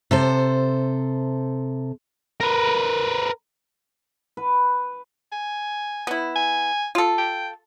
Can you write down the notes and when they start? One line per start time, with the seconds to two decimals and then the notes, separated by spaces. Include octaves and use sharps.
0.11 C3 A4 C5
2.40 A#4 B4
4.37 B4
5.32 G#5
6.07 B3 E4
6.36 G#5
6.95 F4 A4
7.18 G5